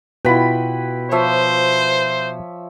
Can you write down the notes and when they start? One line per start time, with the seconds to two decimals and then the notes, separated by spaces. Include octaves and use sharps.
0.25 B2 E4 F4 B4 F#5 G5 B5
1.11 F3 C5 C#5 E5